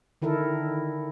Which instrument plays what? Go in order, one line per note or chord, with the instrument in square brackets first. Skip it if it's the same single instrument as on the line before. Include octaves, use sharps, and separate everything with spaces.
[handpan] D3 D#3 E4 A4 A#4